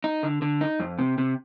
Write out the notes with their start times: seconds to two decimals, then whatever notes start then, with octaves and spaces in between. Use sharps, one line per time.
0.04 D#4
0.23 D3
0.42 D3
0.61 D#4
0.80 F2
0.99 C3
1.18 C3